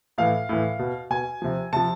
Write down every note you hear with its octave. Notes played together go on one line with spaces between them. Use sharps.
A2 E3 F5
A2 E3
B2
B2 G#5
C3 F3
C3 F3 A5